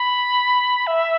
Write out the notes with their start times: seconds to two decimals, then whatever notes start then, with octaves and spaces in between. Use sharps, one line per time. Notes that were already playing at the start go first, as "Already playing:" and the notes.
Already playing: B5
0.87 E5